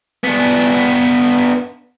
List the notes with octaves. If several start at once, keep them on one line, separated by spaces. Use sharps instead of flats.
B3 D4